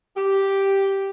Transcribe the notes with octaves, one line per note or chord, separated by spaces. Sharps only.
G4